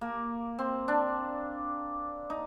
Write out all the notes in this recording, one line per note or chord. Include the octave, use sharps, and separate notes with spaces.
A#3
C4
D4
D#4